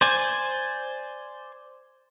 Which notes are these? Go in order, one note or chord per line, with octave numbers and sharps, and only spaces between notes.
C5 D5 G#5